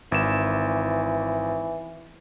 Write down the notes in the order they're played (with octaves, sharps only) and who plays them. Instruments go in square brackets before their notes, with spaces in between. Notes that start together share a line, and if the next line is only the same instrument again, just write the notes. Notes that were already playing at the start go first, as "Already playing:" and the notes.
[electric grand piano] G#1 E7 [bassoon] E3